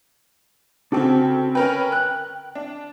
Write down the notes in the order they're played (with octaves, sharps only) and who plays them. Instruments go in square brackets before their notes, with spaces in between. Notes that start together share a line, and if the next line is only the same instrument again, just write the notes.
[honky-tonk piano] C#3 C4 A4 [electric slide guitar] D4 F#4 G5
[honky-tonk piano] C#4 A#4 B4 [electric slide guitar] G5
[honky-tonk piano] F#6
D4